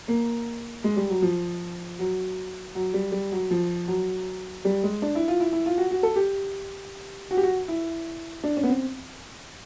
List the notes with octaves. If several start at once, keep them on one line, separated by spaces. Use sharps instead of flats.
A#3
G#3
G3
F#3
F3
F#3
F#3
G3
G3
F#3
F3
F#3
G3
G#3
D4
E4
F4
E4
E4
F4
F#4
F#4
A4
G4
F#4
G4
F#4
E4
D4
C#4
B3
C4